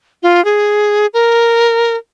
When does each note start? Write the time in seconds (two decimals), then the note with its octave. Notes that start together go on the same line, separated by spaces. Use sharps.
0.23 F4
0.45 G#4
1.14 A#4